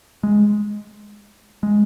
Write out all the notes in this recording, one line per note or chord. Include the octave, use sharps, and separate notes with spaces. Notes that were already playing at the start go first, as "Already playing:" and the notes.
G#3
G#3